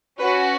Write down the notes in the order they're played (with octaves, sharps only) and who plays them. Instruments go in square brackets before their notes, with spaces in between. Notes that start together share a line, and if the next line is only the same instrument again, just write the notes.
[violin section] C#4 F#4 B4